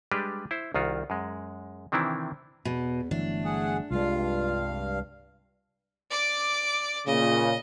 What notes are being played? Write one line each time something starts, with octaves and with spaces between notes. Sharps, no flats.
G3 G#3 D4 G4 B4
E4 C5
C2 D#3 F4 F#4
F#2 G#3
C3 D#3 E3 C4 D4 E4
E2 B2
G1 E3 F#3 A3 D4
G#4 F#5
C2 G2 G#3 F4 F5
D5 D6
A#2 C#3 D#5